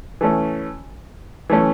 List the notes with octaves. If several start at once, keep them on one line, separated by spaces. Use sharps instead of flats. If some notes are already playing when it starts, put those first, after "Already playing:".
E3 A3 C#4
E3 A3 C#4